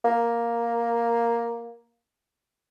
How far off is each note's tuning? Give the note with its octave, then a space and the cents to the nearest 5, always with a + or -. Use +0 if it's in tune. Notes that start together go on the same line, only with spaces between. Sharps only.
A#3 +5